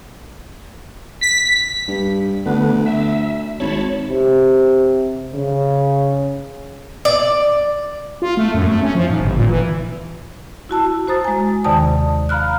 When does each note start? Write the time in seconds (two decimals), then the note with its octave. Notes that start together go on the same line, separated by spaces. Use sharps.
1.21 B6
1.88 G2
2.46 D2 D3 B3
2.86 E5
3.60 G#1 C#5 A5 B5
4.09 C3
5.34 C#3
7.05 D5
8.22 F4
8.37 A3
8.54 F#2
8.67 A3
8.82 C#4
8.95 F3
9.09 G#2
9.21 G1
9.37 A#2
9.49 E3
10.69 E4 F#4 A5 E6
11.08 F#4 C5 A#5 D#6 A6
11.24 G#3 G#5
11.64 D#2 C3 D#3 D5 A5 D#6
12.29 F5 A#5 B5 F6 F#6